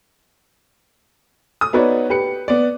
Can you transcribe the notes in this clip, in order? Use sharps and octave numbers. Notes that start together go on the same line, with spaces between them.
D#6
B3 D#4 F#4 B4 C#5 D5
G4 B4 C#7
B3 D5